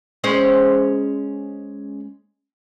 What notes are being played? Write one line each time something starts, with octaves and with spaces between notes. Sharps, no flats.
G#3 C#4 C5